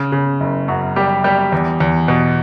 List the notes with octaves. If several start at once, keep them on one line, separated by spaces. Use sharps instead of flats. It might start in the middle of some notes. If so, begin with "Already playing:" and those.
Already playing: C#3
C#3
F#1
F#2 F#4
G3 G4
G3 G4
E2
E2
B2